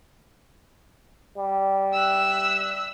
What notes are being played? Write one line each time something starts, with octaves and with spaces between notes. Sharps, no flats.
G3
E5 E6 F#6